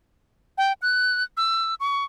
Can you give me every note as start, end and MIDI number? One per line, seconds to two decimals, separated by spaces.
0.58 0.73 79
0.82 1.23 90
1.37 1.75 88
1.80 2.05 85